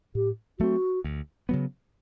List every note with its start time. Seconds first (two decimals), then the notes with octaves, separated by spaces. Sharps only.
0.15 A2 G4
0.59 F#3 A3 C4 F#4
1.04 D2
1.49 C#3 F#3 B3